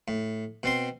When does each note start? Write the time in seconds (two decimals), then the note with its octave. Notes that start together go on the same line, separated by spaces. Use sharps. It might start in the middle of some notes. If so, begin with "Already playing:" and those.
0.08 A2
0.63 B2 C4 C6